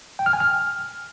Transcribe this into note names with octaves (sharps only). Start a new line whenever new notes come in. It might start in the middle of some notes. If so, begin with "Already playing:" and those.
G5
F6
G#5
F6